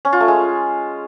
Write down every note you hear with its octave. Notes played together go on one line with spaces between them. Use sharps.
C#4
F4
A3
G#3